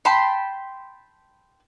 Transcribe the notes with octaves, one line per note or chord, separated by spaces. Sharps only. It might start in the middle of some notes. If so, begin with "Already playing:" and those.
G5 A5 B5 C6